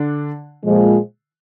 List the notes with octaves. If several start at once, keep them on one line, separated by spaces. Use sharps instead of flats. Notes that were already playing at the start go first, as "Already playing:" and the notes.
Already playing: D3 D4
A#2 F3 G#3